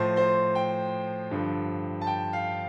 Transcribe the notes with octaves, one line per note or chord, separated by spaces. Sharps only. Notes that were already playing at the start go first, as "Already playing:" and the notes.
Already playing: A2 F3 C5 C6
C5 C6
G5
G2 D3 F3
A5
G5
F5